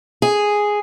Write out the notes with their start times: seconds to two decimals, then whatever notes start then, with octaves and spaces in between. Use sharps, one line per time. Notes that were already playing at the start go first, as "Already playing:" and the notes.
0.22 G#4